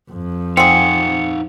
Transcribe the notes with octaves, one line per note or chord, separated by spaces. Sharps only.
F2
C4 D#4 G#4 F5 F#5 C#7